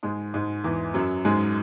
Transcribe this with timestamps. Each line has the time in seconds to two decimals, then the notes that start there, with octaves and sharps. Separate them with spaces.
0.03 G#2 G#3
0.34 G#2 G#3
0.64 E2 E3
0.94 F#2 F#3
1.25 G#2 G#3